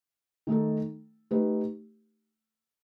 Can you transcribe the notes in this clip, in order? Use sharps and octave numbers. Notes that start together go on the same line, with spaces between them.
D#3 A3 D#4 A4
A3 D#4 G4 B4